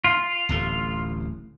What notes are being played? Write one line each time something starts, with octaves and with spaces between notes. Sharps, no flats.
F4
D1 A1 A3